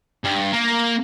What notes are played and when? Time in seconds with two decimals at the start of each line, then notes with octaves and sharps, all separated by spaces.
0.24 G2
0.53 A#3